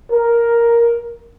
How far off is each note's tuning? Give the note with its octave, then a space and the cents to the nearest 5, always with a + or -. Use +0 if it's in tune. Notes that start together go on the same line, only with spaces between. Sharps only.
A#4 +5